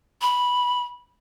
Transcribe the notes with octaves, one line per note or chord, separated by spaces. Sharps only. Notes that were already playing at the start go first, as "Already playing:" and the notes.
B5